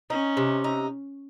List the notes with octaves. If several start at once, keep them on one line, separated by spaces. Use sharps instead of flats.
C#4 D#4
C3
D#4